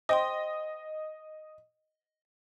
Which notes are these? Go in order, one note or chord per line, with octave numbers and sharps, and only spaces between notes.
C5 D#5 G5 C6